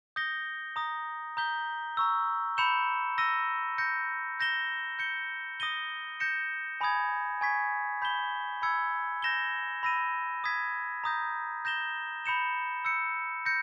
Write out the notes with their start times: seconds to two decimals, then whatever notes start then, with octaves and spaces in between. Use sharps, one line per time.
0.16 D#6 G6 A#6 C#7 G7
0.76 A#5 D#6 A#6
1.37 A#5 D#6 G6 B6 G7
1.97 A#5 C#6 E6
2.57 B5 G6 C#7 E7 G7
3.18 E6 A#6 D#7 G7
3.78 G6 A#6 C#7
4.40 G6 A#6 E7 G7
4.99 G6 C#7 G7
5.60 D#6 A#6 D#7 G7
6.20 G6 A#6 C#7 E7
6.81 G#5 B5 D#6 G#6
7.41 G#5 C#6 G#6 B6
8.02 B5 G6 B6 E7 G7
8.62 B5 E6 G#6 C#7
9.22 G6 A#6 E7 G7
9.83 B5 E6 A#6 D#7
10.44 D#6 G#6 B6
11.04 A#5 D#6 G6 A#6
11.65 G6 A#6 E7 G7
12.24 B5 G6 C#7 E7 G7
12.85 E6 G6 C#7
13.46 G6 A#6 C#7